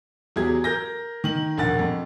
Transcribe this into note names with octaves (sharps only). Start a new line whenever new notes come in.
E2 F#3 G4 G#4 G#6
A#4 G6 A#6
D#3 F#7
E1 A#1 F#5 A6
F2